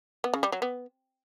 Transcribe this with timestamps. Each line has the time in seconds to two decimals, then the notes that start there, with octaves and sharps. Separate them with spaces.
0.24 B3
0.34 C#3
0.43 G3
0.52 F#3
0.62 B3